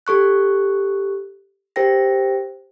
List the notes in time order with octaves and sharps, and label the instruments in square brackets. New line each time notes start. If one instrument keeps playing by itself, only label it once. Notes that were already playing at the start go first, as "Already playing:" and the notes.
[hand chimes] G4 A4 C#6 F#6
G4 A#4 C5 G5 A#6